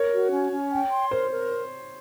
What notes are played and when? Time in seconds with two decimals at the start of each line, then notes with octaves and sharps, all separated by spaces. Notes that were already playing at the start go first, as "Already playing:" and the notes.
Already playing: A#4 C#5
0.11 F#4
0.31 C#4
0.51 C#4
0.71 G5
0.91 C6
1.10 A#4 C5
1.31 A#4